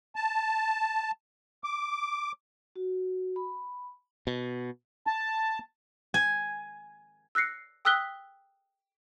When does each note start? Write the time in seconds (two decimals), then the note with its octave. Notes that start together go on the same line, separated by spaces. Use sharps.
0.16 A5
1.64 D6
2.76 F#4
3.36 B5
4.27 B2
5.07 A5
6.14 G#5
7.35 E6 F#6 A#6 C7 C#7
7.85 G5 D#6 E6 F#6 B6 G7